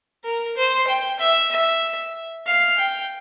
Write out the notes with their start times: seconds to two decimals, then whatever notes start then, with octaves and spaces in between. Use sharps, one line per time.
0.24 A#4
0.57 C5
0.88 G5
1.20 E5
1.51 E5
2.47 F5
2.78 G5